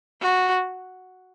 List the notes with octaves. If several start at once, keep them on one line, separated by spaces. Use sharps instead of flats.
F#4